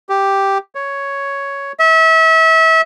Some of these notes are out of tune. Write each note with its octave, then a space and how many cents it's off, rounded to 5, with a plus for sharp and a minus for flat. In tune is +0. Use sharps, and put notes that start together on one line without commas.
G4 +0
C#5 +5
E5 -30